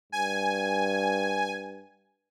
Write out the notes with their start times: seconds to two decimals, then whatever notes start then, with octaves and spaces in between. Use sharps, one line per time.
0.12 G2 G#5